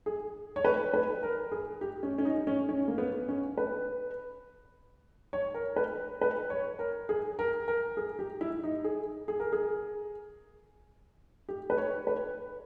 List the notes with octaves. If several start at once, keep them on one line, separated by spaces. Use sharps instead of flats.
G#4
C#5
B4
B4
A#4
G#4
G4
C#4
C#4
D#4
C#4
C#4
A#3
B3
C#4
B4
C#5
A#4
B4
B4
C#5
A#4
G#4
A#4
A#4
G#4
G4
E4
D#4
G#4
G#4
A#4
G#4
G4
B4
C#5
B4